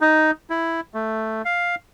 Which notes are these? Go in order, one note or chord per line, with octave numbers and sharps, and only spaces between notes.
D#4
E4
A3
F5